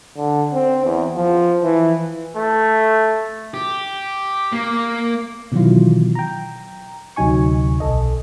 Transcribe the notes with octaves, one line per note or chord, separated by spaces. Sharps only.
D3
C4
E2
F3
E3
A3
G4
A#3
B2 D#3 E3 F#3 E4 F4
G5 A#5
D2 C3 F#3 D#4 G#5 C#6
B1 A4 D#5